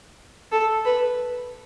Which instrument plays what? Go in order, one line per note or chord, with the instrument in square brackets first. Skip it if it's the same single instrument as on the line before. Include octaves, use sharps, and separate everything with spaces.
[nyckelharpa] A4
B4